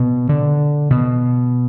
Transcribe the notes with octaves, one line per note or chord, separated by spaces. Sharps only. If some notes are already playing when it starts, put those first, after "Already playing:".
Already playing: B2
D3
B2